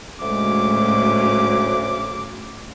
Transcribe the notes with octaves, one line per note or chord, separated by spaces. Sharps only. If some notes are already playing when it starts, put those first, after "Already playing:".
D2 A2 C#3 F#3 G#3 D6